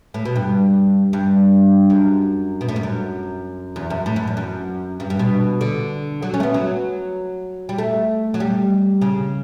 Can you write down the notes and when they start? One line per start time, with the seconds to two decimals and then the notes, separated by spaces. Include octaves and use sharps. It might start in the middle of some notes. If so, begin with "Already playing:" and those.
0.14 A2
0.25 B2
0.36 G2
1.13 G2
1.90 F#2
2.61 B2
2.68 A2
2.76 G2
2.83 F#2
3.76 E2
3.90 F#2
4.06 A2
4.16 F#2
4.27 E2
4.37 F#2
5.00 G2
5.10 G2
5.19 B2
5.61 D3
6.22 F#3
6.34 C#4
6.40 A3
6.43 B3
6.54 F#3
7.69 G3
7.78 A3
8.34 F#3
8.40 G3
9.01 C#3